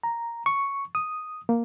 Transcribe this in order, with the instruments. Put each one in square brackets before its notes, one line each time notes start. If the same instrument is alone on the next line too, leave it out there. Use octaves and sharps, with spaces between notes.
[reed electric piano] A#5
C#6
D#6
A#3